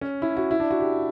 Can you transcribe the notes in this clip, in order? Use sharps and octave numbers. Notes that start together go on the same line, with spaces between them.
C#4
E4
F#4
E4
D4
F#4
G4